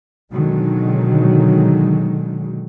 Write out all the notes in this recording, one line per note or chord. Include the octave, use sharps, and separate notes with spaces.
B2 D3 D#3 F#3 G#3